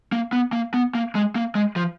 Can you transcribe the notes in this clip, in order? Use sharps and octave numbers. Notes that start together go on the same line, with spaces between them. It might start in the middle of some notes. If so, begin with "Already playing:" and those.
A#3
B3
A#3
B3
A#3
G#3
A#3
G#3
F3